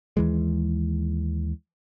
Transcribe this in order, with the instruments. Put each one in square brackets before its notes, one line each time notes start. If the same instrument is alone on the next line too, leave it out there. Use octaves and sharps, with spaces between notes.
[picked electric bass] D#2 E3 G#3